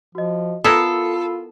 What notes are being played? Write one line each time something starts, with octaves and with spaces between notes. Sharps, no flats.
F3 F#4 D#5
B3 E4 F4 A4 A#4 B5 E6 C7